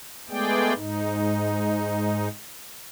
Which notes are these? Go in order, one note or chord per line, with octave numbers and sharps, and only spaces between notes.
G#3 A3 B3 G#4 D5 G5
G#2 D#4